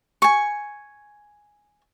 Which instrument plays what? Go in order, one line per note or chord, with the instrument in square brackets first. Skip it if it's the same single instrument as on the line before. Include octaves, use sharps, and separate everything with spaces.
[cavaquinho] G#5 C#6